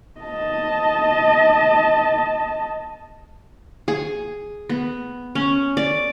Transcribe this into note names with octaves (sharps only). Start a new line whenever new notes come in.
D#5 A5
G#4
B3
C#4
D5